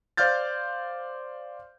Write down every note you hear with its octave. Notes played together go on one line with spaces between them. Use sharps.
C5 D5 F5 F6 G6 A6